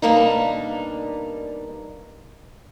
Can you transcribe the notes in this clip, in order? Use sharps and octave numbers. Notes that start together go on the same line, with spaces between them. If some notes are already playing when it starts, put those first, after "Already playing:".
B2 G3 A#3 D4 D#4